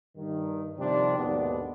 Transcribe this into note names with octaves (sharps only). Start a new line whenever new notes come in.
G2 D#3
C3 D#3 F3 G3 C4 D4
D#2 G#2 B2 D3 B3 D4